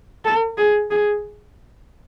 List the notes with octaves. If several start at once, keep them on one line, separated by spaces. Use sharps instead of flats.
A4
G#4
G#4